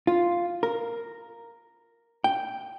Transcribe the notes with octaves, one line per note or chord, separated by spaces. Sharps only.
F4
A#4
G5